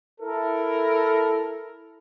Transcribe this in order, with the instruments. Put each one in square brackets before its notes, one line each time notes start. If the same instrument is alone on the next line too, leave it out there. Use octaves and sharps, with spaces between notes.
[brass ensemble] E4 A4 A#4